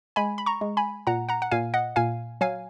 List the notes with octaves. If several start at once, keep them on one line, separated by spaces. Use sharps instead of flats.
G#3 G#5 B5
B5
A#5 C#6
G#3
G#5 B5
A#2 F#5 A#5
F#5 A#5
F#5
A#2 F5 G#5
D#5 F#5
A#2 F5 G#5
F#3 F5 G#5